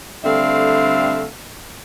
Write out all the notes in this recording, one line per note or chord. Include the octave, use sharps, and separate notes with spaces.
D3 G3 A3 C4 E5 F5